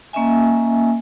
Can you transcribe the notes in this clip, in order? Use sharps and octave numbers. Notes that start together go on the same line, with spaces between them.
A#3 C#4 D#5 E5 G#5